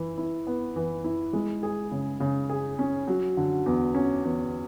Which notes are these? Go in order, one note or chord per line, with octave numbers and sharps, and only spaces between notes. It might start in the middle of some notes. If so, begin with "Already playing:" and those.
Already playing: E3 E4
E4
B3
E3
E4
G#3
G#4
C#3
C#3
G#4
C#4
F#3
D3
E2
C#4
E2